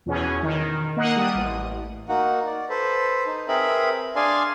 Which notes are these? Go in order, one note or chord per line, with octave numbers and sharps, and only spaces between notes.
E2 B2 C#4 G#4
D#3
A#3 D#5 F#5
G3 D#6
A1
A#3 D#4 F#4 F#5
D5
A4 B4 C5
D#4
C4 G#4 A#4 B4 E5 B5
D4 G#4 D5 F5 G#5 C6